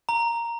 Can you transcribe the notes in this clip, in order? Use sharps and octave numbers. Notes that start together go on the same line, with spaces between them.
A#5